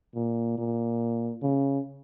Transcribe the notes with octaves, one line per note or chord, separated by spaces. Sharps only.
A#2
A#2
C#3